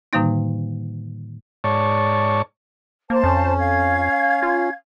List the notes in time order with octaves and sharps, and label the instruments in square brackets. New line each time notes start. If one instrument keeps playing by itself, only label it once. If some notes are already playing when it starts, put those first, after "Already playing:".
[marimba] A2 D3 D#3 G3 A#3 D#4
[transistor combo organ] G#2 C#5 D5 A5 C#6
[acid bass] A#3 [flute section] C5 A5
[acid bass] F2 [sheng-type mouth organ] C#4
[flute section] F5 G#6
[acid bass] F4